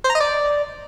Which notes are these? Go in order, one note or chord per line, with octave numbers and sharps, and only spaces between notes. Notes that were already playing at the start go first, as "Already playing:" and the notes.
C5
A#5
D#5
D5